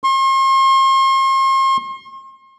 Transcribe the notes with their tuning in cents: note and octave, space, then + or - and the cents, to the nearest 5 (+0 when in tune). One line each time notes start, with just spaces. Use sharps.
C6 +45